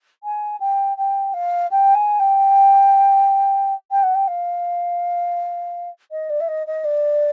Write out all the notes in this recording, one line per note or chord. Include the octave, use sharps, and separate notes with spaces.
G#5
G5
G5
F5
G5
G#5
G5
G5
F#5
G5
F5
D#5
D5
E5
D#5
D#5
D5